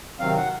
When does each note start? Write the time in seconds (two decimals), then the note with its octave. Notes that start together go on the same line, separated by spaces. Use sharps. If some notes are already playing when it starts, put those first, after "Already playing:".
0.19 C3 D#3 F#3 C4 F5
0.37 F#5